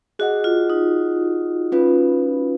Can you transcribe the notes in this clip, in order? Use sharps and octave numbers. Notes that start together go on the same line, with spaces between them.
F#4 G#4 D#5 F#5
F4
D#4
C#4 F4 B4